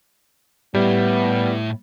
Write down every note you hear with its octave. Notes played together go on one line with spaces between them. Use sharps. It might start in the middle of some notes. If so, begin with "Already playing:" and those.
A2 G3 B3 E4